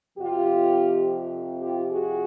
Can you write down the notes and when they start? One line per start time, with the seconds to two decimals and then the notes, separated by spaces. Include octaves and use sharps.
0.18 F2 C3 F3 F4 G4
1.62 F4 G4
1.90 F#4 G#4